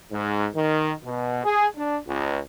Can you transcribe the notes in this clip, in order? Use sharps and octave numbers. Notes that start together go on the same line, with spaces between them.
G#2
D#3
B2
G#4
D4
C#2